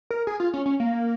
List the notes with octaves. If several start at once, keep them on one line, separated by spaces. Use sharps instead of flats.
A#4
G#4
F4
C#4
C#4
A#3